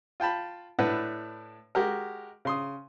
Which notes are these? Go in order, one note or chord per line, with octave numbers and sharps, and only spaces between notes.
F4 G5 A5 B5
A2 D4 E4 B4 F#5
G#3 F#4 G4 A#4
C#3 C6 D#6